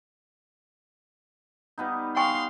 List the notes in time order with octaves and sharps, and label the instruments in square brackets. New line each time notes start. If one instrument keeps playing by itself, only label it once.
[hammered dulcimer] G3 B3 D#4
[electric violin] F5 C6 [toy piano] G5 G#5 C#6